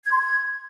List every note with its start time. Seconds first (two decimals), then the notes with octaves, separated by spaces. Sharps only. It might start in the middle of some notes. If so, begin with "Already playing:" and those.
0.05 G#6
0.11 C6
0.18 G#6